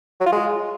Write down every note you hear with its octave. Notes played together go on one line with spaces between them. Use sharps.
F#3
F4
G#3